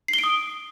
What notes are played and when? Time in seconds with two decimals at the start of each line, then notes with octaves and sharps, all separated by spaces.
0.08 C7
0.13 G7
0.18 D7
0.24 D#6